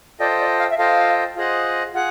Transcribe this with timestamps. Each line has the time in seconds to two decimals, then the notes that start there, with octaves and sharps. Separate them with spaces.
0.20 F4 A4 C5 D5 D#5 G5
0.40 D5
0.59 F5
0.70 E5
0.78 F4 A4 C5 D#5 F5 G5
1.36 F4 G#4 C5 D#5 F#5
1.94 F4 G#4 F#5